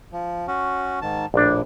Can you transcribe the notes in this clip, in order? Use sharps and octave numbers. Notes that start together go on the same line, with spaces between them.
F3
C#4 F#4
G#2 D#3 A5
A#1 A2 D4